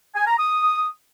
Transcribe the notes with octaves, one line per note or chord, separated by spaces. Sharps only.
G#5
A#5
D#6